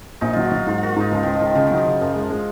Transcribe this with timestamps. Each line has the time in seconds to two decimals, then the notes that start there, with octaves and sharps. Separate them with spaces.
0.21 A#1 D#4
0.33 F#3 F4
0.44 F#4
0.52 F#3 F4
0.67 G#2 F4
0.78 A#3 F4 F#4
0.89 F4
0.96 G#2 D#4
1.11 C#2 F3
1.23 C#2 D#3
1.34 F3
1.41 C#2 D#3
1.55 C#3 F3
1.67 D#3 F#3
1.77 F3
1.86 C#3
2.01 F#2 F3
2.16 G#3
2.30 G#3